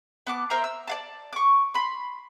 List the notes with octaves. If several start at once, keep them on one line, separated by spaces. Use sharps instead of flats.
B3 A5 D6
A#4 C5 E5 A#5
E6
D5 F5 A5
C#6 D6
B5 C6